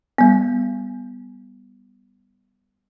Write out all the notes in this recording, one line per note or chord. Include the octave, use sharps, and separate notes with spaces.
G3 B3